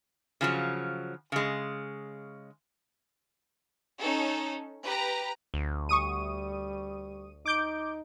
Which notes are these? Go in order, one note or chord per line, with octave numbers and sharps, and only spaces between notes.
C#3 F3 F#3
C#3 G#3
C#4 D#4 A4
G4 B4 A#5
D2
G3 C#6 D#6 D#7
D#4 D6 G6 D7